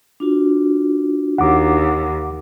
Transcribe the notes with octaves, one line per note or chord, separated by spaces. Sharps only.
D4 F4 F#4
D#2 F#5 D6